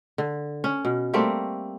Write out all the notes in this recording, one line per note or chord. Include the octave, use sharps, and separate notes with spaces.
D3
C#4
B2
G3 A3 A#3 C4